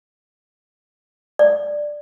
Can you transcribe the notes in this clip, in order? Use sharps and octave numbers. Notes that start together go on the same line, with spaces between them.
D5